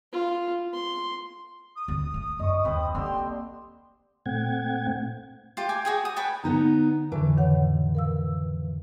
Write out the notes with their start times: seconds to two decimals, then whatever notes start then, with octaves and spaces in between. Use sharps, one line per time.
0.12 F4
0.73 C6
1.76 D#6
1.88 D2
2.14 A3
2.39 F#2 D#5 C#6
2.65 D#2 D#3 C4 B4
2.95 D3 A#3 C4 G4 C6
4.26 A#2 A3 C4 F#5 G5 G#6
5.57 F4 G4
5.69 G5 G#5 D6
5.85 F#4 G#4 G5
6.05 D#6
6.16 B4 C#5 G5 A5
6.44 D3 B3 D#4 A#5
7.12 F2 A2 D3 E3
7.37 D#3 C#5 F#5
7.95 A#4 F5 E6